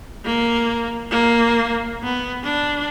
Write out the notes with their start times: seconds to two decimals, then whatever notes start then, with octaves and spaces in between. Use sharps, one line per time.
0.25 A#3
1.11 A#3
2.03 B3
2.44 D4